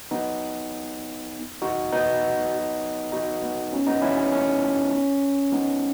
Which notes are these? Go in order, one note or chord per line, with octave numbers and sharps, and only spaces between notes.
B3 D#4
D#4 F#4
B3 D#4
D#4 F#4
B3
C#4
B3 D#4
C#4 E4
C#4
C#4
B3 D#4